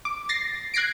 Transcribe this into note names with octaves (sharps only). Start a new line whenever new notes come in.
D6
A6 A#6 C7
F#6 G#6 A#6 C7 D7